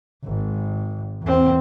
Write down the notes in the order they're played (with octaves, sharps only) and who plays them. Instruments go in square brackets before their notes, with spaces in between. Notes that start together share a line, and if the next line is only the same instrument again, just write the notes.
[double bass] G#1
E2 C4